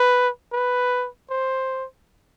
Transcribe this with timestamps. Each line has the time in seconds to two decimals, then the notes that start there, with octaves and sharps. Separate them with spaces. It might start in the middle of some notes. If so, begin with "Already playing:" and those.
Already playing: B4
0.53 B4
1.30 C5